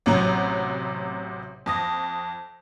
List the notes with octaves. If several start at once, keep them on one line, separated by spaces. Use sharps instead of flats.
A1 C3 F#3 A#5
F2 D#6 A#6